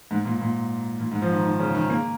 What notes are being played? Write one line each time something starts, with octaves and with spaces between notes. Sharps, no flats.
G#2
A#2
A#2
A#2
G#2
F3
D#3
D#3
C#3
D#3
A#3